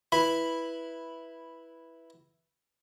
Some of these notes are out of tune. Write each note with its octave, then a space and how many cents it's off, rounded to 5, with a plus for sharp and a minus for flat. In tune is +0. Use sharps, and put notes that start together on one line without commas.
E4 +0 B4 -5 B5 +0